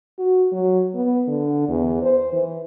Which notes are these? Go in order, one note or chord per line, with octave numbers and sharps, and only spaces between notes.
F#4
F#3
B3
D3
E2
C5
E3